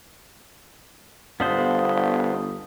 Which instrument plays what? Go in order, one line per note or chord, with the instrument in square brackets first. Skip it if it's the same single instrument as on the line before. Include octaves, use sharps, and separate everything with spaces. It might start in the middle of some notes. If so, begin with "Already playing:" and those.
[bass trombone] G1 [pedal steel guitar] B3 D4 C5 [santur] D#5 F5